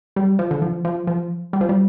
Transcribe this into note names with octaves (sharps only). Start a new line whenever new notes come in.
G3
F3
D3
F3
F3
F3
G3
F3
G3